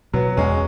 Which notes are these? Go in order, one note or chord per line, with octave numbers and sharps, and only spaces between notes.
B2 F#3 B3
E2 G#3 C#4